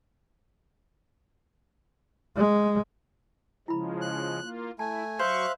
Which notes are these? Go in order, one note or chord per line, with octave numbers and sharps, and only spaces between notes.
G#3
C#3 F3 G#3 E4 B5
F#6
A#3 F4
A3 E4 G#5 A5
F#3 C5 E5 F5 C#6 F#6